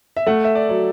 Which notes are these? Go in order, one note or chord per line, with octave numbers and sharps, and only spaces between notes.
E5
A3 F#5
E5
D5
F#3